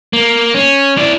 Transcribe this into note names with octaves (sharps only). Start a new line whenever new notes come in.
A#3
C#4
E4 D5